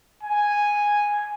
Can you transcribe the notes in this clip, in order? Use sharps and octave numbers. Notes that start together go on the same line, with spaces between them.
G#5